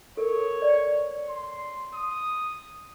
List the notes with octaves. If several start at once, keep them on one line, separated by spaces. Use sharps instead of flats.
A4 A#4 C#5
D5
C6
D#6